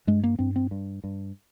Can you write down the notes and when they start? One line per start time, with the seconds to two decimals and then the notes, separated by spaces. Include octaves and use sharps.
0.07 G2 G#3
0.24 A#3
0.39 G2 C4
0.56 C4
0.71 G2
1.04 G2